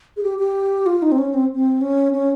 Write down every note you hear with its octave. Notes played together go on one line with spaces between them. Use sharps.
G#4
G4
G4
F4
D#4
C4
C#4
C4
C4
C#4
C#4